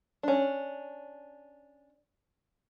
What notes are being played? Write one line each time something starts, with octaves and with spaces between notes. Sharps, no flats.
C#4 D4